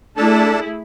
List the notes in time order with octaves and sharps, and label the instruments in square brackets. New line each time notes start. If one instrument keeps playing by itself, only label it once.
[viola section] A3 E4 G#4 [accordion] D4 A4 A5